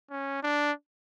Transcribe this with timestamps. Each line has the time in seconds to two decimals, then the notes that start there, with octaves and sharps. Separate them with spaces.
0.10 C#4
0.43 D4